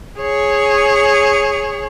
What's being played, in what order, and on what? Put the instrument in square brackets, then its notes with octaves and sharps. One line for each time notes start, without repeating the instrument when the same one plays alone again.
[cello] G#4 C#5